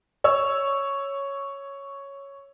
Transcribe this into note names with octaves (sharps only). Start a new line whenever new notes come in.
C#5 E6